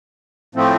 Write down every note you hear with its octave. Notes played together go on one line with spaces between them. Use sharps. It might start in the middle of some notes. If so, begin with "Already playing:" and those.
A2 F3 A3 C4